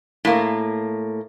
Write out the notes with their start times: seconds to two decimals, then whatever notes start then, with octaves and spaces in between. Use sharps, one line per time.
0.25 A2 A#3